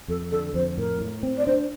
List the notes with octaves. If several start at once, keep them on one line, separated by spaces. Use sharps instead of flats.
F2 A4
D3 A4
F2 C5
A2 A#4
A2
C4
D5
D4 C5